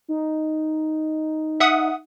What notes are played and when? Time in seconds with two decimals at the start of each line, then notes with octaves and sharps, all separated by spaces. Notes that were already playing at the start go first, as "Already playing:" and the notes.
0.08 D#4
1.60 E5 F#5 D#6